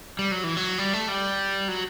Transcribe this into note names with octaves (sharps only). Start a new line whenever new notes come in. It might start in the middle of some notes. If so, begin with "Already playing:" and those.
G3
F#3
E3
F#3
G3
A3
G3
F#3